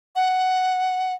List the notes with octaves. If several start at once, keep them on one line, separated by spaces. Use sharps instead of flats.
F#5